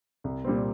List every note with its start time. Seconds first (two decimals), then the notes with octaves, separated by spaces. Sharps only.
0.24 C2
0.44 A#2 G3 C4